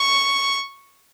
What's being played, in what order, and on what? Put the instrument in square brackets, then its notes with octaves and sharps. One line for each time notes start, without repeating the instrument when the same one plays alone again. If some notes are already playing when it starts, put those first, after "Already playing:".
Already playing: [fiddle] C#6